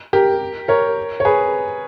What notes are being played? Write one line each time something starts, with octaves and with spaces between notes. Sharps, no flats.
G4 A#4
A#4 C#5
C#5
G#4 B4